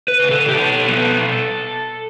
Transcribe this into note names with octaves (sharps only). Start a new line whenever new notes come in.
B4
C#3
A4
G4
B2 A4
B3